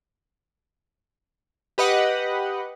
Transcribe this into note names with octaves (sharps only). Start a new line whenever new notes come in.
G4 B4 D#5 F#5